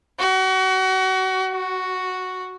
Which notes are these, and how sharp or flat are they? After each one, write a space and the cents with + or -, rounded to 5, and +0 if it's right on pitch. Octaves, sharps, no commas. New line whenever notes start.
F#4 +30
F#4 +0